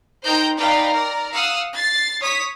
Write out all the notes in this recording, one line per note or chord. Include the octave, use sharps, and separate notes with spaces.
D#4 A#4 C5 G5 A#5 G6
D#4 B4 D5 F5 G5 A#5
A#4 D5
F5 F#5 D#6 E6
A6 C7
C#5 D#6 B6